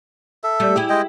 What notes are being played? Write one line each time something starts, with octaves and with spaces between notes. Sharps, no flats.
A4 E5
G3 A3
E4 G4 G#4
G#3 D#5 G5